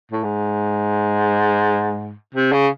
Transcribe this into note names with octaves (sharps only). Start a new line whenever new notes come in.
A2
G#2
C3
C#3